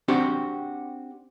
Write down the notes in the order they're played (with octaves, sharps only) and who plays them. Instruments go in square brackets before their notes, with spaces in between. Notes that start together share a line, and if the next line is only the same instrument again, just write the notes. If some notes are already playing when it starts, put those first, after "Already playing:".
[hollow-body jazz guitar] C4 D4 F#4 G4 G5